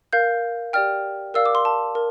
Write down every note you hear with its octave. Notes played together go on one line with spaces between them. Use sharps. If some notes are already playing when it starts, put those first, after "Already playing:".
A#4 F5 G6
G4 D5 G5 F6
A#4 D5 F5 E6
D6
C6
A5
A#4